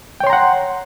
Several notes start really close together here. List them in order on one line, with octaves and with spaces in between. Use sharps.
G5 C#5 C6 A#5 F#5